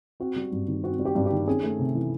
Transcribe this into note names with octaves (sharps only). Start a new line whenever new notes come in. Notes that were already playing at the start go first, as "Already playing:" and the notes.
C4 F#4
G3
G2
D#3
C4 F#4
G3
G4
G2
G4
D#3
C#4 G#4
A3
C3
E3